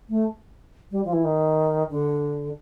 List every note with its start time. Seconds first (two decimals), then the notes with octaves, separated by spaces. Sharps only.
0.09 A3
0.91 G3
1.05 F3
1.13 E3
1.24 D#3
1.90 D3